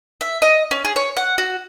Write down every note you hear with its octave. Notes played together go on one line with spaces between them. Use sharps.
E5
D#5
C#4
G#4
C#5
F#5
F#4